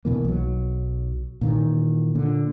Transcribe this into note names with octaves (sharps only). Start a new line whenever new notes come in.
B2 E3 A#3
B1 F#3
A#2 D#3 E3
A#2 D3